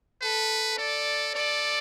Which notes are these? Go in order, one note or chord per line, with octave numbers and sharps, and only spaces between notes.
A4 B4
A4 D5
A4 D5